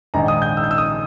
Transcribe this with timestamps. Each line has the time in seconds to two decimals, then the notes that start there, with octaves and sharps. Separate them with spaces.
0.14 A#1 G#2 D#3 A#5
0.28 D#6
0.42 G6
0.57 E6
0.63 G6
0.71 E6
0.78 D#6